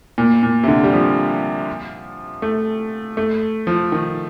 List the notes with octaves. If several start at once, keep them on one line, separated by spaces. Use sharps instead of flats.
A#2
A#2
C3
D3
G3
F3
A3
A3
F3
D#3